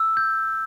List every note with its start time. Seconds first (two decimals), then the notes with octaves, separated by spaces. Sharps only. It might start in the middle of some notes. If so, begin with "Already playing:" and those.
Already playing: E6
0.17 G6